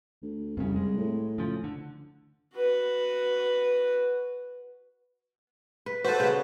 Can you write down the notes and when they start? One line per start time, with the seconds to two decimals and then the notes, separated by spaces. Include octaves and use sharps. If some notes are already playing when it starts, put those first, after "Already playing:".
0.22 D2
0.57 C2 F2 C#3
0.76 G#3
0.97 A2
1.38 C#3 F3
1.64 D3
2.56 F#4 B4
5.86 B4
6.04 F#4 A4 B4 C5
6.20 C#3 B3